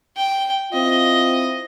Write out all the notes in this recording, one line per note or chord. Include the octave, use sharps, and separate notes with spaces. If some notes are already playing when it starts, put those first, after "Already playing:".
G5
C4 E4 F4 D#5